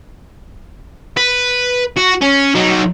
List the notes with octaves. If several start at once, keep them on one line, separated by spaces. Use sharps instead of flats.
B4
F#4
C#4
F#3 D#4